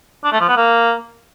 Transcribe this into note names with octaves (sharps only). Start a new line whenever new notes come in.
D4
A3
F3
B3
A#3